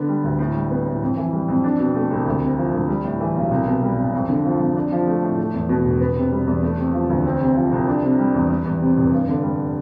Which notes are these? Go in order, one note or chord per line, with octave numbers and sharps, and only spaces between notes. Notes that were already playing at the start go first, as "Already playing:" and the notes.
Already playing: D3 B3
G3
D2
A2
G3
B3
A2
F2
E3
G3
F2
D4
B2
A3
C2
D2
C3
F3
D2
G3
A2
E3
B1
C2
B2
G3
C2
F2
D3
F3
F2
D4
F3
A3
A2
A3
E2
B2
E1
B3
C3
G3
E2
A3
C3
F3
D2
C4
C3
F3
C2
D4
C3
G3
E2
G3
E2
C3
F1
G2
D3
G3